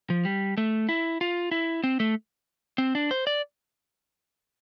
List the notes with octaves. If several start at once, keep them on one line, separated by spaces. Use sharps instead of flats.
F3
G3
A3
E4
F4
E4
C4
A3
C4
D4
C5
D5